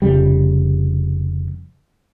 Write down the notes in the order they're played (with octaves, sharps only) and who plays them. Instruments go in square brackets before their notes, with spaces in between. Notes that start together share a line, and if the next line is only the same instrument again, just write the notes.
[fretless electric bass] F1 F2 C#3 G3